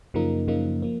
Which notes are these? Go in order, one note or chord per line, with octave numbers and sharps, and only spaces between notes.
F#2 C#3 F3 A#3 D#4
F#2 C#3 F3 A#3 D#4
F3 A#3